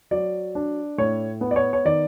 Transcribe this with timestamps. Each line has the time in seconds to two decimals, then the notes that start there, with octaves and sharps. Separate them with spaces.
0.11 F#3 D5
0.55 D4
0.98 A2 C#5
1.41 B3
1.51 D5
1.56 C#5
1.73 C#5
1.85 D#3 D5